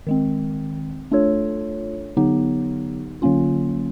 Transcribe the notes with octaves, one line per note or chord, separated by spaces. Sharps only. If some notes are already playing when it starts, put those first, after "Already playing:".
D#3 G#3 C4
A3 D4 F4 A4 C#5
D3 F#3 B3 D#4 G4
D3 F#3 A#3 C#4 F4